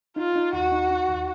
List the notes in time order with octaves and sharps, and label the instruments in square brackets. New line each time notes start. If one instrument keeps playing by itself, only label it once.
[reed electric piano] D#4 [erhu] F4
[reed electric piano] D#4
[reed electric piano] D#2 [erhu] F#4
[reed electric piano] D#4
D#4
D#2